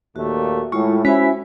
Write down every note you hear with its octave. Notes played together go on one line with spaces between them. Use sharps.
D#2 A#2 A3 F#4
A2 G#3 E4 F4 C#6
C#4 E4 F#4 C5 G#5 B6